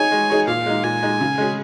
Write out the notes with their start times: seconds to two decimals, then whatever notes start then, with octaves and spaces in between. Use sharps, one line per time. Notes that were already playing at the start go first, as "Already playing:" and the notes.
Already playing: D#4 G#4 C#5 G#5
0.12 G#3
0.30 D#4 G#4 C#5
0.47 A#2 F5
0.66 G#3 D#4
0.83 A#2 G#5
1.03 G#3 D#4
1.21 C#3
1.38 G#3 C#4 G#4